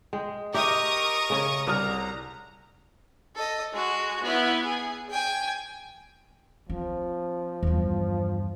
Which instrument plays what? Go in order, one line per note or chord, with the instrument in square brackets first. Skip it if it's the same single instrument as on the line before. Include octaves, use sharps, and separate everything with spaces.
[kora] G#3 [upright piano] G5
[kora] G4 [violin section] A#4 C#6 D#6 [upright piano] D#5 E5
[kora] C#3 C#4
[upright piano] C2 D#6 F6 [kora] D5 [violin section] A#5
[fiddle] A4 D#5
G#3 F#4
B3 E4
G#4
G5 G#5
[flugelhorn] F3 [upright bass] C4
[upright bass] E2 G2